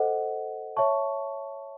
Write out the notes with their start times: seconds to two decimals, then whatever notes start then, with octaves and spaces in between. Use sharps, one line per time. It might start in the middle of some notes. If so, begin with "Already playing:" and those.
Already playing: A4 C5 D#5 F#5
0.76 C#5 E5 A5 C#6